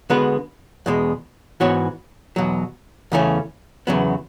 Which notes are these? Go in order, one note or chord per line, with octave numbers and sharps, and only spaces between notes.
D3 G#3 B3 F#4 B4
E2 B2 G#3
G#2 E3 B3 F#4 C#5
E2 B2 F#3
E2 C#3 E3 A3 C#4
E2 C#3 F#3 B3